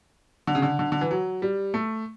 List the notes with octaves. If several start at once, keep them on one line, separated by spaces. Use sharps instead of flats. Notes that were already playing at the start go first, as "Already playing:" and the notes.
D3
C#3
D3
D3
D3
E3
F#3
G3
A3